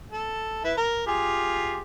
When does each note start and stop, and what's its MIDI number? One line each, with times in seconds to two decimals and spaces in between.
0.11 0.63 69
0.64 0.73 64
0.64 0.73 71
0.77 1.05 70
1.07 1.81 65
1.07 1.81 67
1.07 1.81 68